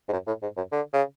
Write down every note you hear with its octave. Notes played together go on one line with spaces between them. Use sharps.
G#2
F#2
A2
G#2
F#2
D3
C#3